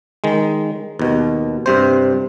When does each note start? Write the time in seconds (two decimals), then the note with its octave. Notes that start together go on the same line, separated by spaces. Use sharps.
0.24 D#3 G#3
0.99 D#2 B2
1.66 G2 C3 C5